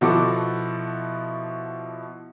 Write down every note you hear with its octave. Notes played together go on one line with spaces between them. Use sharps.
B2 F3 E4 F#4 A4 D6